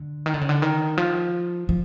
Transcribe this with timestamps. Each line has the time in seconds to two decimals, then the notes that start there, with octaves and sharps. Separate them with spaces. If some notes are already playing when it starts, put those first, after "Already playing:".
Already playing: D3
0.26 D#3
0.34 D3
0.41 C#3
0.49 D3
0.62 D#3
0.97 F3
1.69 F3